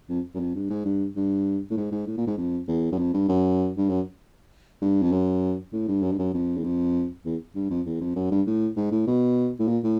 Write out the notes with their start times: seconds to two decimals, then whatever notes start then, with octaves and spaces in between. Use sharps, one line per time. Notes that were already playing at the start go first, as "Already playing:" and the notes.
0.09 F2
0.35 F#2
0.40 F2
0.55 G2
0.70 G#2
0.85 G2
1.16 G2
1.70 A2
1.77 G#2
1.92 G#2
2.07 A2
2.18 A#2
2.27 G#2
2.38 F2
2.68 E2
2.92 F#2
2.98 F2
3.14 G2
3.28 F#2
3.78 G2
3.89 F#2
4.82 G2
5.02 F2
5.12 F#2
5.73 A2
5.88 G2
6.02 F#2
6.12 G2
6.19 F#2
6.34 F2
6.57 E2
6.64 F2
7.25 E2
7.55 G2
7.70 F2
7.86 E2
8.01 F2
8.16 F#2
8.31 G2
8.47 A2
8.76 G#2
8.92 A2
9.07 B2
9.59 A2
9.68 A#2
9.84 A2